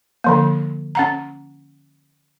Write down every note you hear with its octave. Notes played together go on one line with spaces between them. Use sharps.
D3 F3 A#3
C#4 F#5 A#5